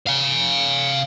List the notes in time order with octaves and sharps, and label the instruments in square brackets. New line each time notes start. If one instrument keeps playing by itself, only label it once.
[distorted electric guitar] F5 G#5